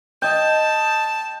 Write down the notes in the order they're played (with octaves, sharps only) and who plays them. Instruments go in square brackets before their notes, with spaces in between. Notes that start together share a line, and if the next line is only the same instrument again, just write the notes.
[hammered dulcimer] D#5 G5 [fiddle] A5